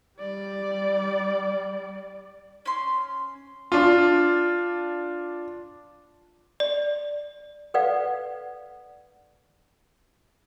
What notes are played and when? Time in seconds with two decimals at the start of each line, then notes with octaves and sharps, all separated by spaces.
0.19 G3 D5
2.66 C#4 C6
3.72 D4 F4
6.60 D5
7.74 A4 B4 D5 F5 F#5